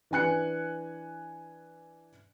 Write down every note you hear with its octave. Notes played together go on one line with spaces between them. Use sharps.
E3 D4 G#5 F#6 C#7